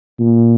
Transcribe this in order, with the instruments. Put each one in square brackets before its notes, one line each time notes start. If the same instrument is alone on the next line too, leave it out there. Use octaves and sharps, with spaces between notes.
[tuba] A#2